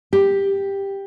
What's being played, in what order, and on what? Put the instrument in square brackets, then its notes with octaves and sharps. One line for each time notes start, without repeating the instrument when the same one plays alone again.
[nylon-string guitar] G4